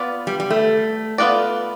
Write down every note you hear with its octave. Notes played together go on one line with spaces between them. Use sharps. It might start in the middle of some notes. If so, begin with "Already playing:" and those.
Already playing: B3 F4 B4 D5
G3
G3
A3
B3 F4 B4 D5